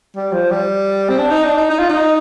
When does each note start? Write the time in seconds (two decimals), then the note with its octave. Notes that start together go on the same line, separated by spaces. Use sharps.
0.16 G3
0.32 F3
0.50 G3
1.09 C4
1.19 D4
1.31 D#4
1.44 D4
1.57 D#4
1.70 D#4
1.80 F4
1.90 D#4